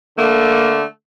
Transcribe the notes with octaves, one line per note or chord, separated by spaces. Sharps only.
D3 A3 A#3